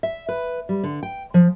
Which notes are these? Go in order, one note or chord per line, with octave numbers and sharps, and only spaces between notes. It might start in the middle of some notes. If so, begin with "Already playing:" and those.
E5
B4
G3
D3
G5
F3